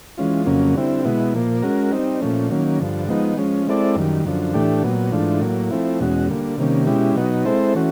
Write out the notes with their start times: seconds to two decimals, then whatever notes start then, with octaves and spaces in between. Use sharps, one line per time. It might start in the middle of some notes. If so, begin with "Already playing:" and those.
0.17 E3 G#3 C#4 F4
0.46 F2 C#3 F#3 A#3 C#4
0.75 D3 G3 C4 E4
1.05 B2 G#3 B3 E4
1.33 A#2 F3 A#3
1.62 G#3 C#4 F#4 A#4
1.92 G3 C4 D#4
2.21 A#2 F3 A3 C#4
2.50 D#3 F#3 A#3 C#4
2.80 G2 D3 F3
3.09 F3 G#3 B3 D#4
3.37 F3 G#3 C#4
3.67 G#3 C4 E4 A4 D5
3.96 F#2 D#3 G3
4.25 F#2 D3 F3
4.54 A2 E3 A3 D4 G4
4.83 A#2 F#3 B3
5.12 G#2 E3 A3 D4 F4
5.41 A2 F#3 A#3
5.71 F3 A3 C4 E4
6.00 E2 B2 G#3 C#4 F#4
6.29 D3 G3 A#3
6.58 C3 D#3 G3 A#3 C#4
6.87 B2 G#3 C#4 E4 G4
7.16 B2 F#3 B3 D#4
7.45 G#3 C4 E4 A4 C5
7.74 E3 A3 C#4 F#4